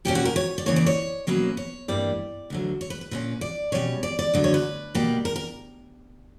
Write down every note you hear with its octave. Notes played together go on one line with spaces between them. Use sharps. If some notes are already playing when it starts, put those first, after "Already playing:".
B2 G3 A#3 C#4 G4
F#4
A#4
C#5
D5
C#3 E3 A#3 C#5
D5
C#5
B2 F#3 A#3 C#4 B4
C#5
G2 E3 G3 A#3 D5
D2 D3 F#3
C#5
B4
B4
A#2 A#3 C#4 B4
D5
B2 G3 C#4 C#5
D5
D5
D2 D3 F#3
C#5
B4
B2 G3 A#3
A#4
A#4